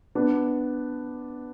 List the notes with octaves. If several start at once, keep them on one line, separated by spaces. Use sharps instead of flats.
B3 D4